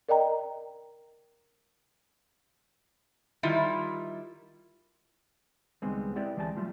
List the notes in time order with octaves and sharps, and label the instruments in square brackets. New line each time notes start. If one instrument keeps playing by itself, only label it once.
[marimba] A#4 D5 D#5 G5 A#5
[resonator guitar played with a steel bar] D#3 G3 E4 F4
[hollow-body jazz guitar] C#2 D#3 G3 G#3 B3 C4
C4 E4 G4 B4 D5 G5
D2 E3 G#3 D5 G#5 A5
F#3 G3 A3 F4